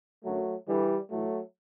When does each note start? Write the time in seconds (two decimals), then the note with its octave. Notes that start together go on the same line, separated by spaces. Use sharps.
0.24 F#2 D3 F#3 A3
0.67 G2 D3 E3 G3
1.10 A2 E3 F#3 A3